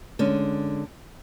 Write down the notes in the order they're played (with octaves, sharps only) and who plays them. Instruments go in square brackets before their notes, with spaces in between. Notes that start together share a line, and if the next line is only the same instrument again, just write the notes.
[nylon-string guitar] D3 G#3 C#4